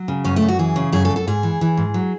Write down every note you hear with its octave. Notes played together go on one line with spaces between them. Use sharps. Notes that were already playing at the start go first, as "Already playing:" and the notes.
Already playing: F#3
C#3
F#2 C#4
A3
F#2
F#4
E3 G#4
C#3
F#2 G#4
A4
F#2
A4
G#2 G#4
E3
E3
G#2
F#3